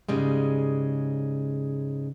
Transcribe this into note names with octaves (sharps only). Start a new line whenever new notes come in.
G#2 C#3 G3 G#3